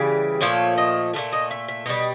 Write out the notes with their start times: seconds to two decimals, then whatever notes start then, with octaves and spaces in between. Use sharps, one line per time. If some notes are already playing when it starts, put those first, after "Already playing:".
Already playing: C#3 E3 G3
0.41 A#2 F3 A3 C#5
0.78 D#5
1.14 A#2 F3 A3 E5
1.33 D#5
1.51 E5
1.69 E5
1.86 B2 G3 D#5